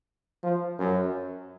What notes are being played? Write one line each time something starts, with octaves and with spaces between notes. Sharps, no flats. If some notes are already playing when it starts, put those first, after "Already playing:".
F3
F#2